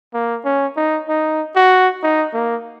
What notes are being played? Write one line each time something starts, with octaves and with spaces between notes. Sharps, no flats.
A#3
C#4
D#4
D#4
F#4
D#4
A#3